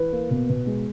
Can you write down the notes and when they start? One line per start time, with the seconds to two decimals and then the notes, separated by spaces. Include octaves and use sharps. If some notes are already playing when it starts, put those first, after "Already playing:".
Already playing: E3 B4
0.12 A#3
0.30 B2
0.49 B2
0.66 G#3